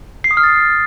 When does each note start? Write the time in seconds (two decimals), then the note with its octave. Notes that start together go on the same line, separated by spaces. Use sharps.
0.24 C7
0.31 D#6
0.37 F6
0.44 A6